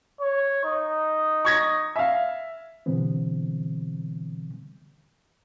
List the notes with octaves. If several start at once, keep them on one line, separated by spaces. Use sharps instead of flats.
C#5
D#4
C#6 G#6 A#6
E5 F5
B2 D3 E3 G3 B3 C4